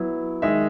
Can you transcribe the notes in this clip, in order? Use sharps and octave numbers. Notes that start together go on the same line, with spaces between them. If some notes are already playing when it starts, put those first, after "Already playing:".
Already playing: F#3 B3 E4
D#3 G#3 D#4 E5